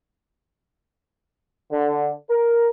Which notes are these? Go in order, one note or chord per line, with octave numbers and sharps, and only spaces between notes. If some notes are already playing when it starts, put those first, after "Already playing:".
D3
A#4